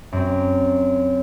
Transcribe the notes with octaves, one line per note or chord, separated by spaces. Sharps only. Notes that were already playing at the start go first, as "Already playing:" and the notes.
F#2 C4